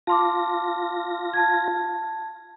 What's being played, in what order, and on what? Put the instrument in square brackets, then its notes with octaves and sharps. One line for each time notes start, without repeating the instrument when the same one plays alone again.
[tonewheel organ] F4 A#6 [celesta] A5 C6 D6
[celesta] A5 G#6